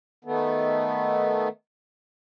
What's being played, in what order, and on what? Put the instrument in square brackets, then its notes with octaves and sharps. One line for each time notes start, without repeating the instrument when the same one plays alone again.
[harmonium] D#3 A3 B3